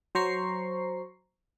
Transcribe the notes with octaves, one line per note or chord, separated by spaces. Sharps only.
F#3 C5 A#5 C#6 C7